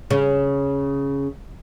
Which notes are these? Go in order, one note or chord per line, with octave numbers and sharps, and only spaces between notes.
C#3